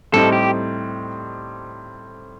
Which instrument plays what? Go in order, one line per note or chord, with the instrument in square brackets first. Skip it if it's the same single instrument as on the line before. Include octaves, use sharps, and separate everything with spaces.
[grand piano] A2 G3 C4 D#4 [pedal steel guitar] A4
[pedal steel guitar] G4